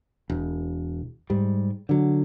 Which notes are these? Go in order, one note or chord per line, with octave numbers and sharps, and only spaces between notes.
E1
G#2 G3
D3 F#3